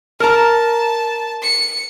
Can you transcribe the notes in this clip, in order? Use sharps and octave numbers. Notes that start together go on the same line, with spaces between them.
A#4 A5 A#5
C#7